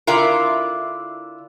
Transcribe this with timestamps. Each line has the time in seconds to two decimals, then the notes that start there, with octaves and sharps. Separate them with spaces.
0.07 D3 E4 F4 A#4